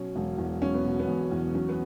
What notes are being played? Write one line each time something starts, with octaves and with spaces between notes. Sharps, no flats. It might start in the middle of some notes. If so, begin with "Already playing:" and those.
Already playing: B2 F#3 C#4
E1
E2
F#3 C#4
B3
B2
B3
E1
E2
F#3 C#4
B3